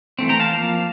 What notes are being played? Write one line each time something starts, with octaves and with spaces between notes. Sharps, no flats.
E3 A3 C4
G5 A#5
F5 A5
F3 A#3